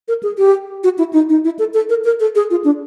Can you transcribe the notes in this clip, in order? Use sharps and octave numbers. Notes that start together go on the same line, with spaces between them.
A#4
G#4
G4
F#4
E4
D#4
D#4
E4
A4
A4
A#4
A#4
A4
G#4
F4
D4